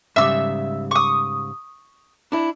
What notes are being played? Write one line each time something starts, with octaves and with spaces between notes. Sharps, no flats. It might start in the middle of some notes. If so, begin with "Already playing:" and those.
G#2 C#3 G3 E5 E6
C#6 D#6
D4 E4